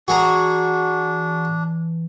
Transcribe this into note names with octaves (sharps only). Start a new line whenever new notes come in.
E3 D4 F#4 G#4 A#5